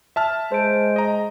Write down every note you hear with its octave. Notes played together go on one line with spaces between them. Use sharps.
E5 A5 F6
G#3 C5 D7
D#5 A#5